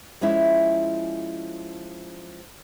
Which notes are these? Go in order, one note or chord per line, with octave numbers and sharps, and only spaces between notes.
F3 G#3 C#4 E4